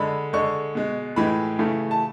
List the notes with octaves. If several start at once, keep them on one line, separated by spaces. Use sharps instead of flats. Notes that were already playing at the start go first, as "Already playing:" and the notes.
Already playing: D3 G#3 B5
D3 G#3 C#6
B2 G#3
A2 E3 G#3 B5
C#3 E3 A3
A5